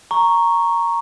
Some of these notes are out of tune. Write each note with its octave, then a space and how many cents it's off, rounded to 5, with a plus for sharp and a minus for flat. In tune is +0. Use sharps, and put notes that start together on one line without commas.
A#5 +0 C#6 +0